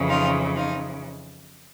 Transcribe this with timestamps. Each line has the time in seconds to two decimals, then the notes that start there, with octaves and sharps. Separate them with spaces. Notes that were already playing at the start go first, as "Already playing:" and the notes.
Already playing: F2 C#3 E3
0.09 D#4 F4
0.56 D#4 F4